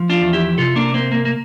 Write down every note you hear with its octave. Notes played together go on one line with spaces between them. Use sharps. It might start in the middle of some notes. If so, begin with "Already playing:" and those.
Already playing: F3
D4 F4
E2
E4 G4
C3 F4 A4
A#3 D4
A#3 C4
A#3
A#3